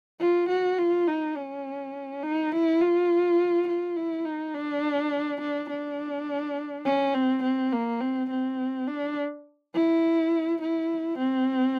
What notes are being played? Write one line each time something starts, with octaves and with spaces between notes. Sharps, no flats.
F4
F#4
F4
D#4
C#4
D#4
E4
F4
F4
E4
D#4
D4
D4
D4
C#4
C4
C4
A#3
C4
C4
D4
E4
E4
C4